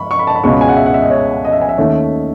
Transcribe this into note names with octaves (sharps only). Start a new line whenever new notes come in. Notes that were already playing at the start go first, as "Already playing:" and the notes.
Already playing: B5 C#6
C#6
B5
A5
B5
C#2 B2 G#3 C#4 C#6
B5
G#5
F#5
E5
F#5
E5
D#5
C#5
D#5
E5
G#5
E5
D#2 D#3 A3 C#4